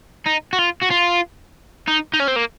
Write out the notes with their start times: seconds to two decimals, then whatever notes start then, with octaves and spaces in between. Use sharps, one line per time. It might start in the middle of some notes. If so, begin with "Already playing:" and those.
0.26 D#4
0.53 F#4
0.59 F4
0.82 F#4
0.90 F4
1.88 D#4
2.14 D#4
2.20 C#4
2.28 C4
2.36 A#3